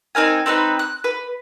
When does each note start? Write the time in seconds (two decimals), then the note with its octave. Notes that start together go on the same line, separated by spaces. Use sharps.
0.15 C4 D#4 A#4 G#5
0.46 C4 D#4 A4 B4
0.79 F#6
1.04 B4